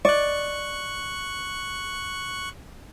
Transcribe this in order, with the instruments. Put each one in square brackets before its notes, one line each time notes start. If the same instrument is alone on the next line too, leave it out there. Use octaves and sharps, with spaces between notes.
[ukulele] D5 D#5 [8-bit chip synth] C#6 F#6